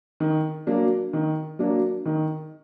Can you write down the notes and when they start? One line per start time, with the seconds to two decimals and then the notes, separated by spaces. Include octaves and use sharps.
0.20 D#3
0.67 F#3 A#3 D4
1.13 D#3
1.59 F#3 A#3 D4
2.06 D#3